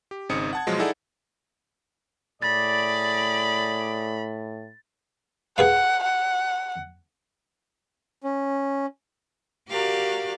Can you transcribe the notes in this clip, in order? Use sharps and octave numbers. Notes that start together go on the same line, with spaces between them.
G4
G#1 C#3 C4 D#4 D#6 C#7
F#5 A5 G#6
B2 F3 F#3 G#3
D#4 E4 G#4 A4 D5 F#5
A2 G#4 D5 B5 A6
G#4 B4 F5 F#5
F#5
C#4
F#4 G4 A#4 D5 F5